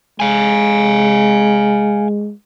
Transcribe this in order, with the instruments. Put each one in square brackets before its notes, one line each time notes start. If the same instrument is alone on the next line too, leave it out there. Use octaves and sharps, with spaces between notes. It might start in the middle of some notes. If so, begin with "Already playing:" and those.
[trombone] G#3 [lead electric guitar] F5 G#5